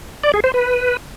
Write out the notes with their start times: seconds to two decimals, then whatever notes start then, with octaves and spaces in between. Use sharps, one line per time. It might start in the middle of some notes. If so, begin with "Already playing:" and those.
0.24 D5
0.34 G#4
0.44 C5
0.54 B4